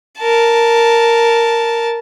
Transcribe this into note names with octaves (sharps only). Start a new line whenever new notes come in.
A#4 A5